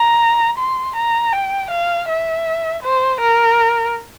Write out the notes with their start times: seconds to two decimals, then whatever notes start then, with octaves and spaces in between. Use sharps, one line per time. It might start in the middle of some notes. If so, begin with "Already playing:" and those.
Already playing: A#5
0.58 C6
0.96 A#5
1.33 G5
1.71 F5
2.08 E5
2.83 C5
3.20 A#4